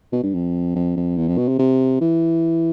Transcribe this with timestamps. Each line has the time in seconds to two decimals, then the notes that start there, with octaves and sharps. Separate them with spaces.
0.12 B2
0.23 G2
0.34 F2
0.75 F2
0.96 F2
1.16 E2
1.27 F2
1.38 B2
1.48 C3
1.59 C3
2.01 E3